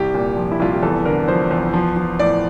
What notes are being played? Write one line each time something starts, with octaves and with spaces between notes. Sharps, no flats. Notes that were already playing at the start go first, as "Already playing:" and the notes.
Already playing: C2 G4
A#2
F3
E4
C2 F4
G4
E2 A4
D3 A#4
F3 C5
E2
F3
F3
A2 D5